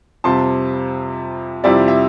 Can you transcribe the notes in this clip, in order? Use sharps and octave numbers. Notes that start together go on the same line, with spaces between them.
F2 C3 G3 A5 C6
F2 C3 G3 C4 E4 D5
E5